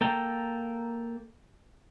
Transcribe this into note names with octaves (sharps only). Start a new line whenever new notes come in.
A#3 A4 G5 A#5